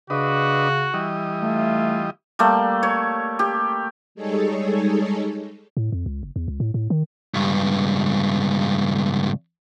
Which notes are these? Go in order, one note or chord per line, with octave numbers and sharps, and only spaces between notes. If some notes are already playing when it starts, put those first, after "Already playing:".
C#3 D4 F#4 B4 D#5
E3 G3 D#5
A3 F4
G3 A3 A#3
C#5
G4
G3 G#3 D#4 G#4 A4 C#5
A2
F2
C#2
F#1
E2
C#2
A2
A2
D#3
C#2 G2